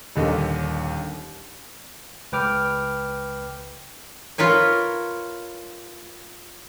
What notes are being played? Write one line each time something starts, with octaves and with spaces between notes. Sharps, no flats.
D#1 D#2 D3 D#5
C#2 B4 G5 D6 F6
F4 A#4 B4 C#5